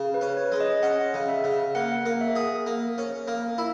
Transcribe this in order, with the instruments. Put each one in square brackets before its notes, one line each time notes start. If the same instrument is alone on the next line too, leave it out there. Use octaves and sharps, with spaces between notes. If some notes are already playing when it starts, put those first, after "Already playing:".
Already playing: [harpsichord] C#3
[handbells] B4
[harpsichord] C#4
[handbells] C#5
[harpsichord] G#3
[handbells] D#5
[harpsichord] C#4 [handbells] F#5
[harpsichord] C#3
[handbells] E5
[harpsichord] C#3
[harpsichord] A#3 [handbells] F#5
[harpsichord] A#3
[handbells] E5
[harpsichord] G#4
A#3
C#4
A#3
E4